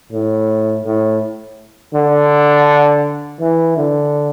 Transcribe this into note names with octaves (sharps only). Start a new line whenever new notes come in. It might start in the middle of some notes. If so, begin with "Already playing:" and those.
A2
A2
D3
E3
D3